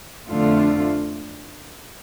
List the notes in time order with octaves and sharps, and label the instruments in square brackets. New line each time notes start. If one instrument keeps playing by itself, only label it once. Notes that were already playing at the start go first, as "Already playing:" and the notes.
[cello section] F2 D3 A3 D4 F4